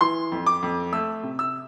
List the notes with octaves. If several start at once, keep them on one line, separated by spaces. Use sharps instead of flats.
E3 C6
F2
D6
F2
A3 E6
C3
E6